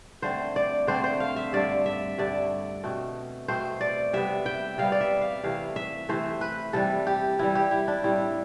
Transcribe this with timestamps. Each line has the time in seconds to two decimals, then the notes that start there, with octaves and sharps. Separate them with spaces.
0.22 D3 A3 C4 C5
0.56 D5
0.87 D3 A3 C4 C5
1.04 C5
1.20 F5
1.36 E5
1.53 G2 D3 A3 D5
1.86 E5
2.18 G2 D3 A3 D5
2.83 B2 A3 C4
3.48 B2 A3 C4 C5
3.81 D5
4.13 C3 G3 B3 E5
4.46 G5
4.78 C3 G3 B3 F5
4.92 D5
5.01 E5
5.21 F5
5.44 C3 E3 A3 F5
5.76 E5
6.09 C3 E3 A3 C5
6.41 B4
6.73 C3 E3 G3 A4
7.07 G4
7.39 C3 E3 G3 E4
7.55 G4
7.71 E4
7.88 D4
8.03 A2 G3 C4 E4